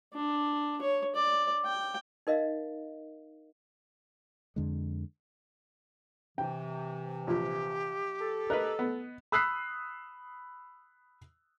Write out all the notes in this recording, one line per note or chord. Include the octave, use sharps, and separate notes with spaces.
D4
C#5
D5
G5
D#4 A#4 D#5 F5
F2 D3 G#3
C3 E3 G5
A#1 A#2 G4
A4
A#4 B4 D#5 F#6
B3
B5 D#6 E6 F#6 B6 C7